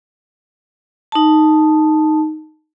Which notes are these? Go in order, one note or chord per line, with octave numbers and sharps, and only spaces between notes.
D#4 A5